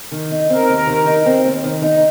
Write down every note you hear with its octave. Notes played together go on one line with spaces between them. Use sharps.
D#3
D#4
C4 A#4
D#2
D#3
D#4
C4
D#2
D#3
D#4